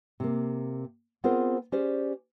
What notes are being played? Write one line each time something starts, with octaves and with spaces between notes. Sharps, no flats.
C3 A#3
B3 C4 F4 G#4 A#4 C5
C#4 G4 G#4 C5 D5